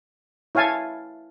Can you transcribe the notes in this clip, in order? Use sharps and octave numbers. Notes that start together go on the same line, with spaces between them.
E4 C#5 F5 G#5 A5